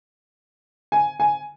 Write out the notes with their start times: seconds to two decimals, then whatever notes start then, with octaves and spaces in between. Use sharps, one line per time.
0.92 G#5
1.20 G#5